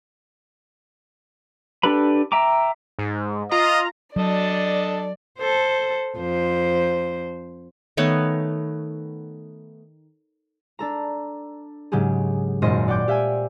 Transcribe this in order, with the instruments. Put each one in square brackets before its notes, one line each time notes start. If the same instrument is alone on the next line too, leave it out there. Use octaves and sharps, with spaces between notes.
[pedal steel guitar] D4 G4 A4 B4 B5
E5 G5 A#5 D6
[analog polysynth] G#2
[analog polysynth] F4 A#5 [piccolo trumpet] D#5
[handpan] F#3 [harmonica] D4 A4 D#5 [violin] D5
[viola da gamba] A4 C5
F2 C5
[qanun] D#3 A3 B3 C#5
[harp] D4 A4 A#5
G#2 C#3 F#3 G4 G#4
G#1 F#2 A#2 C5 D#5 A#6
D5 F#5 G5 D6 G6
G4 E5 F5 G5 G#5